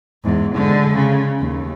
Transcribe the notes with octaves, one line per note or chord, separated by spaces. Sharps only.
E2 G#2
D3 G#3
C#3
D#2